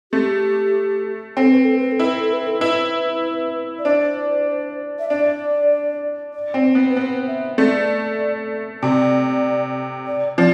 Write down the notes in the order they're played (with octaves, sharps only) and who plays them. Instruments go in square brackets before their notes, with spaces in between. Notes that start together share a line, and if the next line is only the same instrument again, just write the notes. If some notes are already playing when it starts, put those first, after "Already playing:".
[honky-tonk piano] A3 [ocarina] G4
[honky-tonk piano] C4 [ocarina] A4
[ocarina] B4
A4
B4
A4
[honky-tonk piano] E4
[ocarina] B4
A4
B4
A4
[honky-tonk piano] E4 [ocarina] B4
[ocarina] D5
[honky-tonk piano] D4 [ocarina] C5
[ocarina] E5
[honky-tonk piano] D4 [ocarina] D5
[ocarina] D5
[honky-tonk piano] C4
[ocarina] C5
[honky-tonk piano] B3
[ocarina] B4
[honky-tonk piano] B3 [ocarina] C5
[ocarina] E5
[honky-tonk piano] A3 [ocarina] D5
[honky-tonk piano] C3 [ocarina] D5
[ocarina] D5
[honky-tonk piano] F3 [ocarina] D5